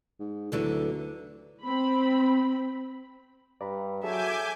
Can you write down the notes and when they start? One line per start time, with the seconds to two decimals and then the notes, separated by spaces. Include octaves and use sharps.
0.20 G#2
0.52 D2 D3 E3 F#3
1.64 C4 B5
3.61 G2 D5 A#5 B5
4.03 F#3 G#4 A4 E5 G#5 A5 D6 G6